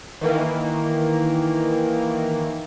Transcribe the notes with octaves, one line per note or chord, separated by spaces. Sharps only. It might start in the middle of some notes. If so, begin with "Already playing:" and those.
D#3 E3 A#3